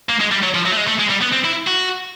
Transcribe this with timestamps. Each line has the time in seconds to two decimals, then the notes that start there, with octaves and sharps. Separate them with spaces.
0.09 A#3
0.21 G#3
0.32 G3
0.43 F#3
0.55 F3
0.66 F#3
0.72 A3
0.77 G#3
0.88 A3
1.00 G#3
1.10 G3
1.22 B3
1.33 C4
1.45 E4
1.67 F#4